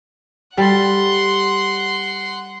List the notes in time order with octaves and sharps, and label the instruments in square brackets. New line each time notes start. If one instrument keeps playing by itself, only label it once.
[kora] G3 A4 [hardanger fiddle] F#5 C6